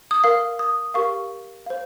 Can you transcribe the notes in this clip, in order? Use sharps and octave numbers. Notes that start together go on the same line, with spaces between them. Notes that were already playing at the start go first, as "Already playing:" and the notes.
D#6
A#4 F5
D#6
G4 A#4 F5 C#6
C5 F5